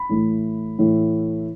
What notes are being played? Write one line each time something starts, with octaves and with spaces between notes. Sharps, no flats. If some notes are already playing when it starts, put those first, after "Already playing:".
Already playing: B5
A2 E3 A3 E4
A2 E3 A3 E4